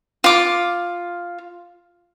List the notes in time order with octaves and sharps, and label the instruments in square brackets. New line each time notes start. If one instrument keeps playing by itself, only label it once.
[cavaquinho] F4 D6